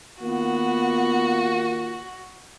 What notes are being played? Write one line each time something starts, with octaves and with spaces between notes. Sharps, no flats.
D#3 A#3 B3 F4 F#4